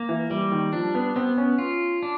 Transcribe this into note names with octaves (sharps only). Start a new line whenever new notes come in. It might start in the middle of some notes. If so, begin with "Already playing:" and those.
Already playing: A#3
E3
E3 G3
D#3
F3 D4
B3
B3 C4
C#4
F4
D4